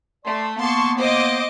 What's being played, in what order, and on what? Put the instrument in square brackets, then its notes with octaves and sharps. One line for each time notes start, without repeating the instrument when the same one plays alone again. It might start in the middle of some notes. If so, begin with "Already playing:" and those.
[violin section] A3 [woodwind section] D5 C6
[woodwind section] A#3 B3 [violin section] A5 C6 C#6
[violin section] C5 D#5 D6